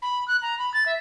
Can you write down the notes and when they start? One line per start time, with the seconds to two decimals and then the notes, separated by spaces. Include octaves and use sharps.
0.02 B5
0.28 F#6
0.42 A#5
0.59 B5
0.74 A6
0.86 E5